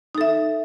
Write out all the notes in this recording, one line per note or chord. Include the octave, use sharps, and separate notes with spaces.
D#4 A4 E5